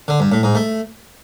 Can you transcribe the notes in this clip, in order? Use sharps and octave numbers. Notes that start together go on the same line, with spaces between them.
D3
G2
A2
G#2
A3